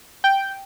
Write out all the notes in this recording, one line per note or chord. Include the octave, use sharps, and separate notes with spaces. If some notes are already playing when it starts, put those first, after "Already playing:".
G5